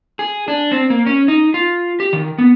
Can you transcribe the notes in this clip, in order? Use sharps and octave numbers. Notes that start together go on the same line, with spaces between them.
G#4
D4
C4
A#3
C#4
D#4
F4
G4
D#3
B3